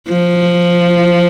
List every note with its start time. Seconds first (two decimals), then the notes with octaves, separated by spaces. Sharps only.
0.09 F3